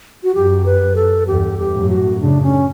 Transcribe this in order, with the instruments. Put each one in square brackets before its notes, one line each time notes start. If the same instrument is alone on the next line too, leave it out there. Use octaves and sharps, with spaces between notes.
[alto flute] F#4
[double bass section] F#2 [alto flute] G4
[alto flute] B4
A4
[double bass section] E2 G2 [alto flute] G4
[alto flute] G4
[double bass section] F#2 A2
[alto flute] F#4
[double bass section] A2 C#3 [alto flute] D4
[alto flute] C#4